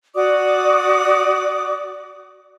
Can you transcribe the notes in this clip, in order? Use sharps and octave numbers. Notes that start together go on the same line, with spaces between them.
F#4 D5 D6 D#6